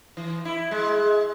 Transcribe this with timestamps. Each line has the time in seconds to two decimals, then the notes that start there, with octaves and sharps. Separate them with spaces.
0.17 E3
0.45 E4
0.71 G#3